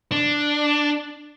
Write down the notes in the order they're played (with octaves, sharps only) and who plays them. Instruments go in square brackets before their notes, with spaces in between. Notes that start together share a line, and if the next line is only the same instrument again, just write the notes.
[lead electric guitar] D4